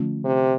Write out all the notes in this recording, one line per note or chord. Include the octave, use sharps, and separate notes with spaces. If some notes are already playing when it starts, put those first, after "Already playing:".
Already playing: D3 F3 A3 C#4 F4
C3